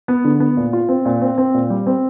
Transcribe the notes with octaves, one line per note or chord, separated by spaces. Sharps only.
B3
D3
B3
A#2
F4
C4
A#2
C4
C4
A#2
G3
C4